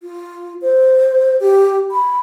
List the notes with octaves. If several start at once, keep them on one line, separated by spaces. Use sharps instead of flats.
F4
C5
G4
B5